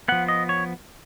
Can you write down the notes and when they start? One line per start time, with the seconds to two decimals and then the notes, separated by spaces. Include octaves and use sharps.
0.08 F3 B3 F#5
0.28 D#5
0.49 C#5